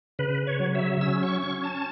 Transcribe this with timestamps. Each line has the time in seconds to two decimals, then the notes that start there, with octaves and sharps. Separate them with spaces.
0.19 C#3 B4
0.47 C#5
0.60 F#3
0.75 E5
1.01 C#4 E6
1.23 C#6
1.42 C#4 C#6
1.64 A5